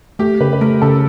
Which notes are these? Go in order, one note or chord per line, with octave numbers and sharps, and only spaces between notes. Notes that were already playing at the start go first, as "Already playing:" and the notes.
A3 G4
C#3 B4
B4
A3 A#4
C#3 A4